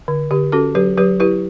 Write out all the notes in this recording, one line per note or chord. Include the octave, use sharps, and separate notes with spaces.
D3
D3 G4
C#4 F#4 A4
F#3 G4 B4
F#3 G4 B4
E4 G4 B4